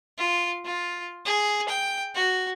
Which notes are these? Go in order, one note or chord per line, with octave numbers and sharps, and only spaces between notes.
F4
F4
G#4
G5
F#4